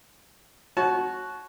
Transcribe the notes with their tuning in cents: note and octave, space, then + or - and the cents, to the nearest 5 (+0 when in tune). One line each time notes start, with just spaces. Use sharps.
F#4 +0 C#5 -15 A5 -30